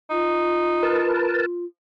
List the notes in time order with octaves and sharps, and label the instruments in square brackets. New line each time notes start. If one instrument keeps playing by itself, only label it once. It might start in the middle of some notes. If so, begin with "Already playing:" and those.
[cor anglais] D#4 [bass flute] F4
[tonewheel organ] A#4 B4 A5